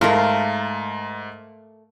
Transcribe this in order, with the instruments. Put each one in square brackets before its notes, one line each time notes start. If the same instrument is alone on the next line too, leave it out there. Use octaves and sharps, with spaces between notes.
[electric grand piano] G#2 A5 C6 [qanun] A3 A#4 F5